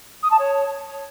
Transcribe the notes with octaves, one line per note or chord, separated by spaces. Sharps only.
D#6
A5
C#5